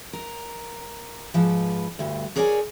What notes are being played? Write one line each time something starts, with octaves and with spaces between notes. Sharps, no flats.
A#4
G#2 F3 B4
D2 G2
G#4 A#4 C#5 D5 G5 G#5